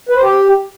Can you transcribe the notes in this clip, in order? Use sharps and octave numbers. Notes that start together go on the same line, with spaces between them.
B4
C5
G4